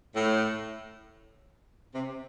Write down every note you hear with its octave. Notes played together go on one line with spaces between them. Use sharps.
A2
C3